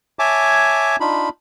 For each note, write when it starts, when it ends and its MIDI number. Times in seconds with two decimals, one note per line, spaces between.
0.19 0.96 73
0.19 0.96 76
0.19 0.96 80
0.19 0.96 81
0.19 0.96 86
1.00 1.29 62
1.00 1.29 63
1.00 1.29 65
1.00 1.29 83